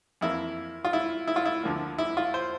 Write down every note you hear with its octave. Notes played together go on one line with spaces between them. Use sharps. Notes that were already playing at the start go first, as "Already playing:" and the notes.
F2 E3 A#3 E4
F4
E4
E4
F4
E4
D2 D3 F3 A#3
E4
F4
C5